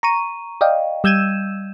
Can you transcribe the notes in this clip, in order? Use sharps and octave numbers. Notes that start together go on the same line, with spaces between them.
A#5 C#6 D#7
D5 D#5 F5 G5
G3 E6 G6 G#6 D#7 E7